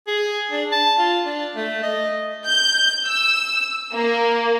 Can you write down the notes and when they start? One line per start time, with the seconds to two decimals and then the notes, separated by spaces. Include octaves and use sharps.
0.07 G#4
0.51 D4
0.72 A5
0.99 F4
1.26 D4
1.56 A3
1.83 D#5
2.45 G6
3.08 E6
3.93 A#3